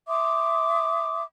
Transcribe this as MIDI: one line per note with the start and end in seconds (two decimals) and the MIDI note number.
0.08 1.22 76
0.08 1.22 84
0.08 1.22 86
0.08 1.22 87